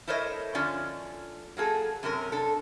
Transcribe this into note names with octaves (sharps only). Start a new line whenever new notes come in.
E4 A4 A#4 C5 C#5 D#5
D3 F3 C#4 F4 D5
F#3 A#3 G#4 A4
F#2 C3 C#4 A#4
D4 A4